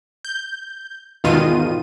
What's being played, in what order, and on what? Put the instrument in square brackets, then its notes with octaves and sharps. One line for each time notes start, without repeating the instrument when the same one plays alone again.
[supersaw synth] G6
E2 G#2 B2 D#3 F4 D#7